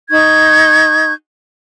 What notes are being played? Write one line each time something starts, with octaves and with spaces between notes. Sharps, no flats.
D#4 C#6 G6 G#6